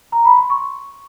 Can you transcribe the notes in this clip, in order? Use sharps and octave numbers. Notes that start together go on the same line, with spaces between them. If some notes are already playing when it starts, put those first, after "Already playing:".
A#5
B5
C6
C#6